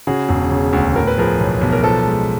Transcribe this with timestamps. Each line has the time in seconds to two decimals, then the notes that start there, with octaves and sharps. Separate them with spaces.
0.07 C#3 F#4 G#4
0.29 E1
0.51 C#3
0.73 D2
0.95 A2 A#4
1.07 B4
1.18 F3 G#4 A#4
1.40 B1
1.61 B1
1.72 A#4
1.84 F3 A4 B4
2.06 G#3